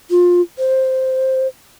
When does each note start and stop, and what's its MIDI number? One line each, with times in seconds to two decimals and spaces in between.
0.10 0.41 65
0.58 1.47 72